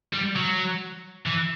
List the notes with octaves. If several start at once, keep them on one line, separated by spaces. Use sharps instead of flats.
G3
F#3
E3